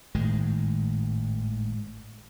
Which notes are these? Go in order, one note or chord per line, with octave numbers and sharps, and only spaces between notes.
G#1 A2 D#3 G#3